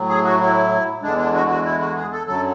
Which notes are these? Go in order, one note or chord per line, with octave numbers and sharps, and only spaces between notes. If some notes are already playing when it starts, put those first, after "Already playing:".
Already playing: A2 F#3
G#4
F#4
E4
E2 D3 G#3 D4
D4
F#4
F#4
E4
F#4
G#4
A4
F#2 D3 F#3 A4